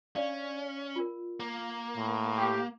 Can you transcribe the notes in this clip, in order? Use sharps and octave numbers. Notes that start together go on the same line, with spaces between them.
C#4 D4 D5 F5
F4 A#4
A#3
A2
G4